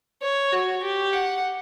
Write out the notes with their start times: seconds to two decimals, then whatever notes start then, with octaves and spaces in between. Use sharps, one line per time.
0.22 C#5
0.52 F#4
0.83 G4
1.13 F#5